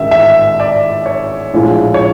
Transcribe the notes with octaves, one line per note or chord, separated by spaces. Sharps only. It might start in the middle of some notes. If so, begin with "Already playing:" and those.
Already playing: A1 G#2 D#3 E5
E5
D5
C#5
A#1 A2 F3 G#3
C#5